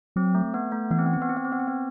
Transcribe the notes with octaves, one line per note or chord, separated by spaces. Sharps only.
F#3 C4
A3
B3
A3
E3 B3
C4
B3
C4
B3
C4
B3
C4
B3
C4
B3